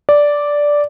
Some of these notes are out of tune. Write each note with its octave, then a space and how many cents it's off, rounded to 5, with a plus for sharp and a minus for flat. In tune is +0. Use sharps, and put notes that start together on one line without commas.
D5 -5